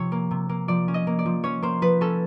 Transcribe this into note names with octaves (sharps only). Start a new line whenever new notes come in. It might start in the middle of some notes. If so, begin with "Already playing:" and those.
Already playing: C3 F3 C#5
A#3
C3
A#3
F3 D5
C#4
D#5
A#3
D5
F3
C#4 C#5
A#3 C5
F3 B4
C#4 A4